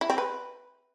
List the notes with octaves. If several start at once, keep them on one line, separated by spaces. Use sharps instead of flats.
E4
C4
B4